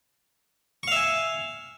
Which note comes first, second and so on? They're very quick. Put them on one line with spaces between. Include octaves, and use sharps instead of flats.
C#6 F5 E5 G#5